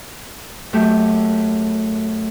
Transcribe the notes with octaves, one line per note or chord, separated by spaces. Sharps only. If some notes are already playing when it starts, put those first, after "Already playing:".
F#2 A3 G4